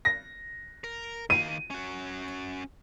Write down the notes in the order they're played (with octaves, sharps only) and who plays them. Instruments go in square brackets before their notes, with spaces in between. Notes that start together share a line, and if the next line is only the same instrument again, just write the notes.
[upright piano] A#6
[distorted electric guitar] A#4
[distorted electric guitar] D#3 F5 [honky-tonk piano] D#7
[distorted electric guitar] C#4 F#4